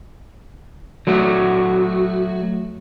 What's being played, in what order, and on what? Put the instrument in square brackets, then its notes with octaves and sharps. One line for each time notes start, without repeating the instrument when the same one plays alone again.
[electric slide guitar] F#3 A3 F#4